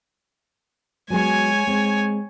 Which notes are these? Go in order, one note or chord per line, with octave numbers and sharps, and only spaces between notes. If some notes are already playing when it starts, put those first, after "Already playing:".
F#3 G#3 B3 G#4 C#5 G#5
G#3 C4